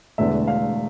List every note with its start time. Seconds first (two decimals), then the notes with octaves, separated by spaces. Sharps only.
0.18 E1 E2 D3 A3 E5
0.48 F5